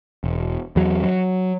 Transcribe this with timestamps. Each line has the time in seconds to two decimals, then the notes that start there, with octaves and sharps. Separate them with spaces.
0.24 E1
0.76 E2 F#3
1.04 F#3